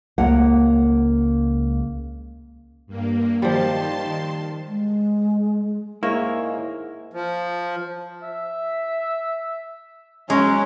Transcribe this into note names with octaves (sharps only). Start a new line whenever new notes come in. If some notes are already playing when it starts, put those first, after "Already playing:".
C#2 A#3 C#5 F#5
G2 A#3
D#3 F3 G3 A5 C6
G#3
G#2 A#3 E4 C#5
F3
E5
F#3 G#3 C#4